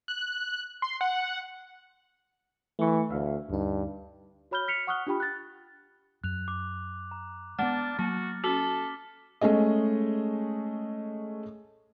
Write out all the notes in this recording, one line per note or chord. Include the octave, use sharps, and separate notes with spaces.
F#6
C6
F#5
E3 A3 C#6
D2 E5 F5
D2 G2 D#4
F#4 C#5 B5 F6 G6 G7
F6 B6 C#7 F7
F#5 C#6 D#6 F6 F#6 G7
D4 F4 G4 G5 B5
F#6 A6
F#2 F#6 F7
D6
A#5
G#3 A3 B3 D4 F#5 F6 A6
F#3 A#3 F#4 A5
C#4 F#4 A4 D6 B6 G7
G#3 A3 C#4 G#4 D#5